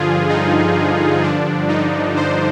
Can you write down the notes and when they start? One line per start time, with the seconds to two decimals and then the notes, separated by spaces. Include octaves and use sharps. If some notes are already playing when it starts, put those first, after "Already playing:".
Already playing: G2 D3 F3 F4 G#4
0.29 D#4
1.22 G2 D3 F3 D4
1.68 D#4
2.16 C5